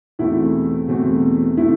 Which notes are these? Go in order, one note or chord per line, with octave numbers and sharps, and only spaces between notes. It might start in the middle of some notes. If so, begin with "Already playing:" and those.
E2 B2 A3 C4 E4
E2 B2 A3 C4
C3 E3 A3 C4 E4